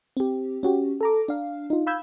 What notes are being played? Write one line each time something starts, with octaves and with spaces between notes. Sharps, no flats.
C4 G4
C#4 F#4 G4
A4 A#5 D6
D4 F5
D#4 F4
F5 B5 E6 G6 G#6